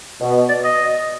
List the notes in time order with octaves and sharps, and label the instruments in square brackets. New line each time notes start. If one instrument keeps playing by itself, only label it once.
[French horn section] B2
[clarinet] D5
D#5